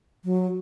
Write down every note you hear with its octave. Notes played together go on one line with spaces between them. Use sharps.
F#3